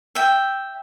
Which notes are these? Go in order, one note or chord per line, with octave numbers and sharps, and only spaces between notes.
E5 G5